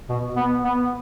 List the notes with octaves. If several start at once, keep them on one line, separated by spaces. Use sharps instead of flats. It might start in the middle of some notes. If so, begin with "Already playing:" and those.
B2
B3
B3